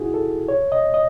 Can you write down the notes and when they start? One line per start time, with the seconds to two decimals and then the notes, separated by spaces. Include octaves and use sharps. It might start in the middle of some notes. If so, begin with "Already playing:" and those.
Already playing: D#4 E4 F#4 G#4
0.14 A4
0.48 C#5
0.72 D#5
0.94 D#5